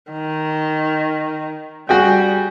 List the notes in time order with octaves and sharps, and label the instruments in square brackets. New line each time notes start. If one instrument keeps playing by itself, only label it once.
[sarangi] D#3
[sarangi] G3 [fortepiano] F#4 G#4 G5